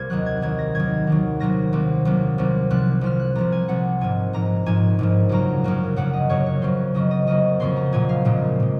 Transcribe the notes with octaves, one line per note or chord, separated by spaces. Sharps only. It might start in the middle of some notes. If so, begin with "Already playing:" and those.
Already playing: C2 A#3 G#6
D#2 D#3 F#3 F#6
G#6
D#2 D#3 F#3 G#6
A#6
D#2 D#3 F#3 G#6
D#2 D#3 F#3
C2 C3 F#3 A#3 A#6
C2 C3 F#3 A#3
C2 C3 F#3 A#3
C2 C3 F#3 A#3
C2 C3 F3 F#6
C2 C3 F3 F6
F#6
C2 C3 F3 A#5
G#5
C2 C3 F3 F#5
A#1 G#2 F3 G#5
A#1 G#2 F3 A#5
A#1 G#2 F3 G#5
A#1 G#2 F3
F#2 C#3 F#3 A#3 A#5
F#2 C#3 F#3 A#3
F#2 C#3 F#3 A#3 F#5
D#5
F#2 C#3 F#3 A#3 C#5
C#5
F2 C#3 F#3 A#3 C5
F2 C#3 F#3 A#3 D#5
D#5
F2 C#3 F#3 A#3 D#5
F2 C#3 F#3 A#3 C6
A#5
A#1 A#2 G#3 G#5
F5
A#1 A#2 G#3
A#2 G#3